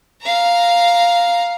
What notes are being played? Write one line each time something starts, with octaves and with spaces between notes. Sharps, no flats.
F5 A#5